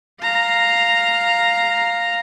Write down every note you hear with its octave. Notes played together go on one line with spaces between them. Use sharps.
F5 A#5